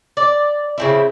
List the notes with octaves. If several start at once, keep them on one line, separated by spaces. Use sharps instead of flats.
D5
C#3 C4 E4